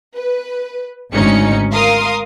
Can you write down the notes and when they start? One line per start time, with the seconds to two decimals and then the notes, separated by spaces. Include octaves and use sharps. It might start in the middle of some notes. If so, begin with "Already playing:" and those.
0.15 B4
1.14 G#1 D2 G#2 C#4 D#4 C#7
1.72 A#4 F5 C6 D#6